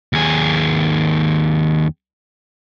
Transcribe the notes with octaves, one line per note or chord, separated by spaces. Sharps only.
D#2 G#4